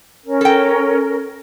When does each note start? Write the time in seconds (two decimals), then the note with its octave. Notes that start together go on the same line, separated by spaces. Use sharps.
0.25 C#4 A#4
0.41 A4 G5